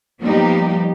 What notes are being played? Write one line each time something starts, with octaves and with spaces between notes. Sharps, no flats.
F3 G3 A#3 B3 D#4 G4